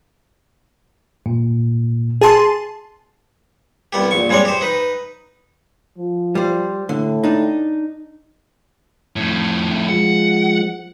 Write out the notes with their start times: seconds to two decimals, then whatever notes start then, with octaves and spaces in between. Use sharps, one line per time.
1.26 A#2
2.21 G#4 A5 C6
3.93 C2 B3 G4
4.11 A#1 C#6
4.30 G2 G#3 C4 C#5 D5
4.45 G4 C5
4.61 D#4 B4
5.98 F3
6.35 G3 C5
6.89 A2 D3
7.24 D4 D#4
9.16 F2 A2
9.89 F3 G#3 F#5